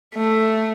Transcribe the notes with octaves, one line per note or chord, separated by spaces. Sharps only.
A3